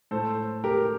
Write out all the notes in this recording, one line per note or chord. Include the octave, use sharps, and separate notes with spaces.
A2 A4 C5
G4 A#4